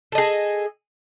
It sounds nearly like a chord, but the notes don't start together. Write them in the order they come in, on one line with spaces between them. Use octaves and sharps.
A4 D#5 G#4